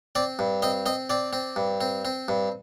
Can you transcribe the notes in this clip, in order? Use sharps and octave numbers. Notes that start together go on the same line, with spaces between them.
C4 D5
G2
C4 D#5
C4 D#5
C4 D5
C4
G2
C4
C4
G2